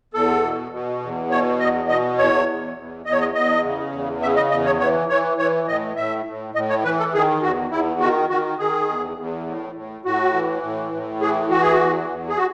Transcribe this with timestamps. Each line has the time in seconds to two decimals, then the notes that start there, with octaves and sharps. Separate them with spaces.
0.14 E2 A4
0.44 B2
0.72 B2
1.02 E2
1.31 B2 C#5
1.59 E2 D#5
1.88 B2 D#5
2.18 E2 C#5
2.47 E2
2.77 E2
3.06 E2 D#5
3.12 C#5
3.20 D#5
3.34 E2 D#5
3.64 C#3
3.92 E2
4.22 C#3 E5
4.36 D#5
4.51 E2 D#5
4.66 C#5
4.80 E3 C#5
5.09 E3 C#5
5.38 E3 C#5
5.67 A2 D#5
5.96 A2 E5
6.25 A2
6.55 A2 D#5
6.70 C#5
6.84 E3 B4
6.99 A4
7.14 D#3 G#4
7.42 E2 F#4
7.71 E2 E4
8.00 D#3 F#4
8.30 D#3 F#4
8.59 D#3 G#4
8.89 E2
9.17 E2
9.46 A2
9.75 A2
10.05 A2 F#4
10.34 E3
10.63 A2
10.92 A2
11.20 E3 G#4
11.50 E3 F#4
11.61 G#4
11.73 F#4
11.80 E2
12.09 E2
12.28 G#4
12.37 F#4